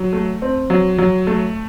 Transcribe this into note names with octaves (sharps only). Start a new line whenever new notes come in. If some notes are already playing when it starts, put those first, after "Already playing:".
Already playing: F#3
A3
C4
F#3
F#3
A3